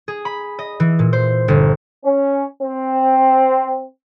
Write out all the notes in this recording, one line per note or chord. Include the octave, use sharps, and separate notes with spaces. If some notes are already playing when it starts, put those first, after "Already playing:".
G#4
B5
D#5
E3
A#2
C5
G1
C#4
C4